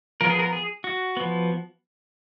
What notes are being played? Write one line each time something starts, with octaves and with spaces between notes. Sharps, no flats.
F3 B3 A#4
G#4
A#4
G#4
F#4
F3 B3